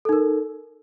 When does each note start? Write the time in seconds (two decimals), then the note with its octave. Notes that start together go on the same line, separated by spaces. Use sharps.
0.05 A4
0.09 D#4
0.13 A#4